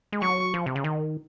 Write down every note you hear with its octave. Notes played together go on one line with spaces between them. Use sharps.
G#3
F#3 C#6
F3
C3
C#3
D#3